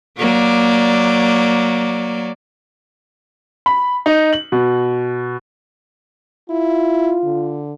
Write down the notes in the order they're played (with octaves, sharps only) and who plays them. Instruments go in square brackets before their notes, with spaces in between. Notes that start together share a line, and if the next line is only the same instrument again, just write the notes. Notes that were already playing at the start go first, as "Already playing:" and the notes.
[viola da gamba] F#3 A#3 D5
[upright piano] B5
D#4
F#7
B2
[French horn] E4 [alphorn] F4
[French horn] D3